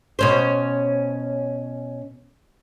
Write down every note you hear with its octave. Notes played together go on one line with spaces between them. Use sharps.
B2 C#4 C5